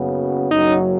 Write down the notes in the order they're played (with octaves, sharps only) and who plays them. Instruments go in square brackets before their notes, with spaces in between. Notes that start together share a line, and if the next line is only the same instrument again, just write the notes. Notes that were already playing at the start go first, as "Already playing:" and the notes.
Already playing: [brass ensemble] F#1 F#2 C#3 B3 F#4
[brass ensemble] F#1 F#2 F#3 [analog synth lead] D#4